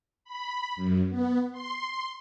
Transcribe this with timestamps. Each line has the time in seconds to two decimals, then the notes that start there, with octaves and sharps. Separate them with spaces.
0.25 B5
0.76 F#2
1.10 B3
1.52 C6